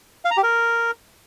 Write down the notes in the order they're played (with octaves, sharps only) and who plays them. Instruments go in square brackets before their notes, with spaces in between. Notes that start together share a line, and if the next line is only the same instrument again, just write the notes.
[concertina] F5
A#5
G4
A#4